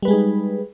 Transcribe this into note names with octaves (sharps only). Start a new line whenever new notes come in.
G3 G#3 D#4 G#4 B4